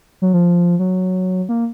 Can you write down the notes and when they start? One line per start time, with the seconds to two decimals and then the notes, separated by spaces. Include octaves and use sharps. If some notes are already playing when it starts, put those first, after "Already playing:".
0.22 F#3
0.34 F3
0.79 F#3
1.49 A#3